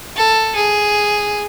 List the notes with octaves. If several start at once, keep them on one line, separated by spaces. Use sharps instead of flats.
A4
G#4